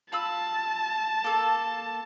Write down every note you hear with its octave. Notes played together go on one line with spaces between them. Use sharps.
F4 A5 B5 E6
A#3 A4